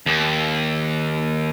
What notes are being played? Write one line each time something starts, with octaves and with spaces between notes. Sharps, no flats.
D#2